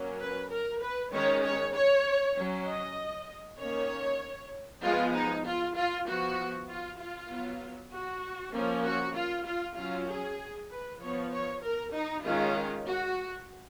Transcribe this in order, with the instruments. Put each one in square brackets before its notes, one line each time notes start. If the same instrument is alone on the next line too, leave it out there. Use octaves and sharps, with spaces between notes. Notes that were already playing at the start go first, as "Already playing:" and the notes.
Already playing: [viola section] F#3 A#3 C#4
B4
A#4
B4
D#3 G#3 C#4 C#5
C#5
C#5
F#3 C#4
D#5
D#3 A#3 C#4 C#5
F3 G#3 B3 F4
D#4
F4
F4
F3 B3 F#4
F4
F4
F#3 B3
F#4
F3 A#3 C#4
F#4
F4
F4
F#3 C#4 F4
G#4
B4
F3 B3 C#5
C#5
A#4
D#4
D#3 G#3 C#4 F4
F#4